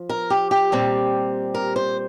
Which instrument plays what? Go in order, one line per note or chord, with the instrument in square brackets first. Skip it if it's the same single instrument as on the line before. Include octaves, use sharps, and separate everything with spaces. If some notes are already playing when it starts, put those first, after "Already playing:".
Already playing: [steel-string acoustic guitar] F3
A#4
G4
G4
A#2 G3 C4
A#4
C5